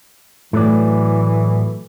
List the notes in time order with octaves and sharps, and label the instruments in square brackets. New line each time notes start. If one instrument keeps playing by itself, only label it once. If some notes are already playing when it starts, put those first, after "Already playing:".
[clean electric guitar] A2 F#3 D5 [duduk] E3 [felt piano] A3